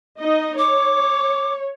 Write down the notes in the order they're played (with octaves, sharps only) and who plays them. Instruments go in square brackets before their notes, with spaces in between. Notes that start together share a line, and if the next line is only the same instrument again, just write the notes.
[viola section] D#4 D#5
[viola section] C#5 [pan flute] D6